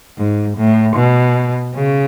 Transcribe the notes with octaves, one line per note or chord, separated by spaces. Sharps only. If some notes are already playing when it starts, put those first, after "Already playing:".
G#2
A2
B2
C#3